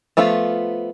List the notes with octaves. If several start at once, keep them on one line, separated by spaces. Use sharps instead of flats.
F3 A3 B3 F4